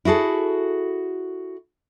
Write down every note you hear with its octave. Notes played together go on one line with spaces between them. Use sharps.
E4 F#4 G#4 A4